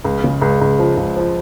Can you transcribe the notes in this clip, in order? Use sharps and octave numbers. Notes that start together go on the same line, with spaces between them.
C#2
C#3
C#2
C#2
F3
C#2
F3